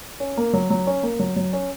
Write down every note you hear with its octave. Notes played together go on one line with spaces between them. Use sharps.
C#4
A#3
F#3
F#3
C#4
A#3
F#3
F#3
C#4